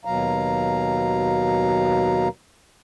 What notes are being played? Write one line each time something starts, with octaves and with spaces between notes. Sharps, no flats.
D#2 B2 F#3 F5 A#5